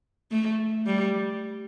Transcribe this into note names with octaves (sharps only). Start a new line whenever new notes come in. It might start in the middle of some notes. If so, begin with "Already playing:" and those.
A3
G3